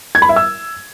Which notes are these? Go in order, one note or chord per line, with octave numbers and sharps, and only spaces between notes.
G#6
B5
E5
E6